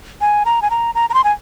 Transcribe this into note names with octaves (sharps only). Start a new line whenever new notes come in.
G#5
A#5
G#5
A#5
A#5
A#5
C6
G#5